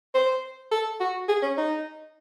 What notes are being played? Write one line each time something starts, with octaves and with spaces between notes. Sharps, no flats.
C5
A4
F#4
G#4
C#4
D#4